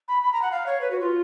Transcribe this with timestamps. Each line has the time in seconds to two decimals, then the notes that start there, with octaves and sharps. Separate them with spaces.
0.08 B5
0.22 B5
0.32 A#5
0.42 F#5
0.52 F5
0.66 C#5
0.81 B4
0.91 F#4
1.00 F4